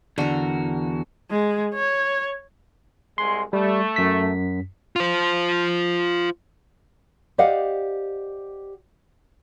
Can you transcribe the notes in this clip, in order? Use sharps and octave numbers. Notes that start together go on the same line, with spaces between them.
E2 D3 F#4 A#4
G#3
C#5
C2 G#3 C6
G3 A3
F#2 B6
F4 C5
G4 C5 D5 D#5 F5 F#5